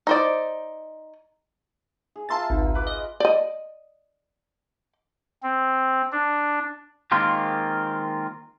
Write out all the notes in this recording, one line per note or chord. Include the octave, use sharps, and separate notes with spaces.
D#4 C5 D5
G#4
F4 E5 A5 A#5 C6 A6
G#1 C#2
B4 D6
D#5
D5 D#5
C4
D4
D#3 G#3 A#3 C4 F4 G4